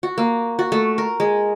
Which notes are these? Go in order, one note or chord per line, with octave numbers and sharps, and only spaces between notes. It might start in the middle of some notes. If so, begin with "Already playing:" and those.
F#4
A#3
F#4
A3
A#4
G#3